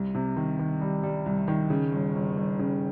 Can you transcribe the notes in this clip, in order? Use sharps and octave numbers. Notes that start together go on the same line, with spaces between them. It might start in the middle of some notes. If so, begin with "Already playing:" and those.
Already playing: C2
C3
D#3
D#3
G3
G3
C2
D#3
C#3
G1
G1
G1
C#3